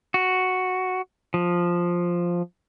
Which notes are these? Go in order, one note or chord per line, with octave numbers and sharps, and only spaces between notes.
F#4
F3